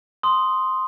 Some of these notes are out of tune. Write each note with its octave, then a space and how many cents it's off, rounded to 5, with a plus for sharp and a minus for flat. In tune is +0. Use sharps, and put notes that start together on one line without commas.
C6 +0 D#6 +0